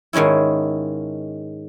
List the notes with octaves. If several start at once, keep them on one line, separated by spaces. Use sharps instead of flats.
G#2 D#3 G#3 C#4 E4